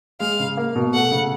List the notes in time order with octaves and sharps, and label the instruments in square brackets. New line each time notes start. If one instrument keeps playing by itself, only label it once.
[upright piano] G#3 [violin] F5
[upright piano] C#3
A#3
B2
[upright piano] A3 [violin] F#5
[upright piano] C#3